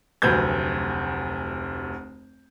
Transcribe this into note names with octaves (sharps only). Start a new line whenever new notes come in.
F1 D2 F#3 B4 G6 G#6